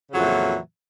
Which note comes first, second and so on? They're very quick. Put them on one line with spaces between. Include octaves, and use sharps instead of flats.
C#3 F#3 F2 E3 A#2